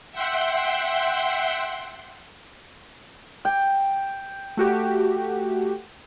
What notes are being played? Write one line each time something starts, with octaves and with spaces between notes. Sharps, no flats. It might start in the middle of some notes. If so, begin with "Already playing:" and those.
E5 F#5 G5 C6
G5
A3 F#4 G4